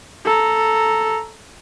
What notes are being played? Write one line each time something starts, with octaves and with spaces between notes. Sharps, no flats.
A4 A#5